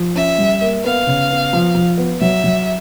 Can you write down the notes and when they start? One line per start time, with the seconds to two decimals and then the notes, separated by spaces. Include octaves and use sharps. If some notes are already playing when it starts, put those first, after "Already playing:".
Already playing: F3
0.15 C#4 E5
0.38 G3
0.61 A#3
0.84 B3 F5
1.07 C#3
1.30 B3
1.53 F3
1.75 F3
1.98 B3
2.20 F#3 E5
2.44 F#3